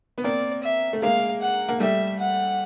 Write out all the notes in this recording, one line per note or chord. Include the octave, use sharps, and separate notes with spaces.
B3
A#3 C4 D5
E5
A3
G#3 A#3 F5
F#5
A#3
G3 A3 E5
F#5